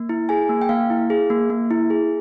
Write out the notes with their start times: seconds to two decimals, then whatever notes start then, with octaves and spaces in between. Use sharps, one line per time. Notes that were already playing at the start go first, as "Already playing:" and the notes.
Already playing: A#3
0.09 E4
0.29 G#4 G#5
0.49 A#3
0.62 G5
0.69 A#3 F5
0.90 E4
1.10 G#4
1.30 A#3
1.50 A#3
1.71 E4
1.90 G#4